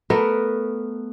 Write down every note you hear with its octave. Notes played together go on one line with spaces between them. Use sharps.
A3 B3 A#4